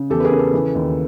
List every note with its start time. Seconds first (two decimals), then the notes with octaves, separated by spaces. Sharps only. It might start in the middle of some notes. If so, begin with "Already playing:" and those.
Already playing: C#3
0.10 E2 G4 A4
0.20 B4
0.25 G#4 A#4
0.32 C#3
0.39 A4 B4
0.53 E3
0.75 D#2